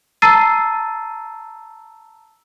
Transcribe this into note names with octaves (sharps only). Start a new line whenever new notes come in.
A5 A#5 E6 A6 C7 D#7